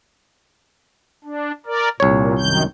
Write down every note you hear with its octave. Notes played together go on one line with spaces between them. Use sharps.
D4
A#4 D5
C2 A#2 C#5
F#2 D#3 G6